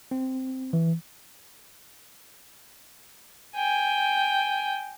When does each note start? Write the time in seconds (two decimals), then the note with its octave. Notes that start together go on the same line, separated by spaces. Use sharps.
0.11 C4
0.73 E3
3.56 G5 G#5